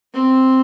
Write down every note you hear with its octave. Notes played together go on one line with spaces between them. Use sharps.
C4